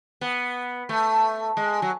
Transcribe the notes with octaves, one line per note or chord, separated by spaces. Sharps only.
B3
A3
G#3
F#3